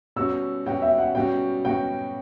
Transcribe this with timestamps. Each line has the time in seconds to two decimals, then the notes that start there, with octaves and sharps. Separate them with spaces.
0.16 B2 G3 C#4 F#4 E6
0.66 B2 G3 C#4 F#4 G5
0.82 E5
0.98 F#5
1.15 B2 G3 C#4 F#4 G5
1.65 B2 G3 C#4 F#4 G5